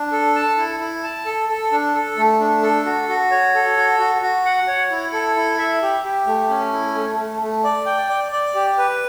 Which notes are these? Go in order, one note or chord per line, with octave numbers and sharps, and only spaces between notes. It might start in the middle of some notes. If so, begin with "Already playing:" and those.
Already playing: D4
A4
A5
E4
E4
A5
A4
A4
D4
A4
A3
D4
A4
F#4
F#4
C#5
A4
F#4
F#4
F#4
F#5
C#5
E4
A4
E4
E5
G4
G4
A3
C#4
E4
A3
A3
A3
D5
G5
D5
D5
G4
B4